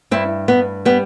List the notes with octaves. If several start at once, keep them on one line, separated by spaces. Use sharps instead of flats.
G2 C4 E4
G2 B3
G3 B3